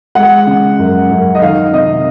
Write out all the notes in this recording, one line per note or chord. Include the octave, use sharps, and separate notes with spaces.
G#3 F#5
C#3
F#2
F#2
D#5
D#3 F5
C3 D#5